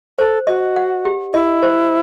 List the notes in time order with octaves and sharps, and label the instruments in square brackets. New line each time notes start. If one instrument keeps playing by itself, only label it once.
[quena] A4 [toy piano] C5
[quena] F#4 [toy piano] D#5
[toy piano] F#5
G4
[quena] E4 [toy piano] D#5
[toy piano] C5